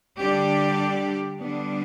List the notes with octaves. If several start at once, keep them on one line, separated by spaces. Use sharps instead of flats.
D3 G3 D4 G4 D5
D3 G3 B3 D4